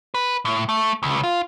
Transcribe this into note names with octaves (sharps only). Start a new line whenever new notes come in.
B4
A2
A3
C#2
F4